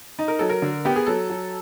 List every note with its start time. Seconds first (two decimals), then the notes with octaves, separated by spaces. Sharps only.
0.19 D#4
0.28 A#4
0.39 F#3 A4
0.49 A#4
0.62 D3
0.85 B3 G4
0.96 G#4
1.07 F#3 A4
1.30 F#3